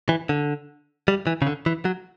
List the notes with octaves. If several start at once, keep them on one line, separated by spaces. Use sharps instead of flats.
E3
D3
G3
E3
C#3
D3
E3
F#3